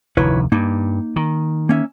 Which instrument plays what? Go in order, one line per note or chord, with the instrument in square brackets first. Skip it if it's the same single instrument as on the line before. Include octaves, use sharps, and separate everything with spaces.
[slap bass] F1 D2 D#3 [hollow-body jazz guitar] E4 B4 C#5
[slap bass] G2 [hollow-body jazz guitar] A#3 D#4
[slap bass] D#3
[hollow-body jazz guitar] A#3 C#4 E5